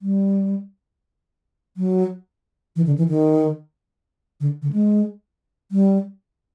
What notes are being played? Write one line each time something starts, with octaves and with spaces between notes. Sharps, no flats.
G3
F#3
E3
D3
E3
D#3
D3
D3
G#3
G3